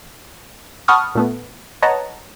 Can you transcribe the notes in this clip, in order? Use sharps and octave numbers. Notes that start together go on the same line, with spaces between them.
F#5 A5 B5 C#6 D#6 F6
A#2 A3 B3
B4 C#5 D#5 F#5 A5 A#5